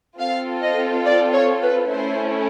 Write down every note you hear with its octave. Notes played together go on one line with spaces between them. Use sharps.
C4 F4 A4 F5
D#5
D5
C#5
B4
A3 C#4 E4 C5